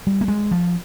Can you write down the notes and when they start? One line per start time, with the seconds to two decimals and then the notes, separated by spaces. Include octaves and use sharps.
0.07 G3
0.21 A#3
0.28 G#3
0.51 F3